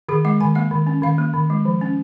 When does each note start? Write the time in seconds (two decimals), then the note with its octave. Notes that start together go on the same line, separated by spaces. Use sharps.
0.09 D#3 G#4
0.25 G#3 F#5
0.41 D#3 G#5
0.55 A#3 F#5
0.71 D#3
0.87 C#4
1.02 D#3 F5
1.18 A#3
1.34 D#3
1.50 G#3
1.65 F3
1.81 C#4